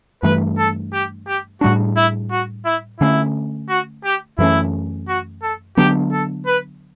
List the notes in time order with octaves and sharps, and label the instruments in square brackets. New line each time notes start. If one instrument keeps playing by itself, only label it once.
[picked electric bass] G2 E3 A3 [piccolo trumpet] B4
[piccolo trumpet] A4
G4
G4
[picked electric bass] A2 G3 D4 [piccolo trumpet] F#4
[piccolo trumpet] E4
F#4
E4
[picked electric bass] D3 A3 C#4 [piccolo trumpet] E4
[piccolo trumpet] F#4
G4
[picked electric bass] F#2 E3 A3 C#4 [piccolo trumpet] E4
[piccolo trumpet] F#4
A4
[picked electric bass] D3 F#3 B3 D4 [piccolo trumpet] G4
[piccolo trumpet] A4
B4